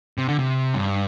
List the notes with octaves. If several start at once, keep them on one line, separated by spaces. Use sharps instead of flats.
C3
D3
C3
G2